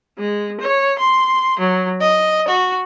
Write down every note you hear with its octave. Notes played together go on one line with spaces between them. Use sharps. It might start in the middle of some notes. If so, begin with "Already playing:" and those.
G#3
C#5
C6
F#3
D#5
F#4